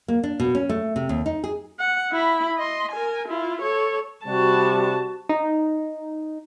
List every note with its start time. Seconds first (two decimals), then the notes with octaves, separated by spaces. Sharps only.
0.08 A#3
0.24 D4
0.40 B2
0.55 C#4
0.69 A3
0.96 C3
1.09 D#2
1.26 D#4
1.44 G#4
1.79 F#5
2.12 E4 B5
2.57 D#5 C6
2.92 A#4 G#5
3.28 E4 F4
3.62 A4 C#5
4.26 C3 G3 F#4 A5
5.29 D#4